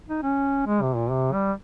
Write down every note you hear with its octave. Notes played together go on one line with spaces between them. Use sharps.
D#4
C#4
G#3
C3
A#2
C3
G3